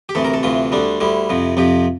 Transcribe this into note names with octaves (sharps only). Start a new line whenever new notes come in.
G4
D2 C3 E3 A4
A#4
A4
D2 C3 E3 F4
D2 D3 G3 D4
D2 D3 G3 E4
F2 C3 F3
F2 C3 F3 G4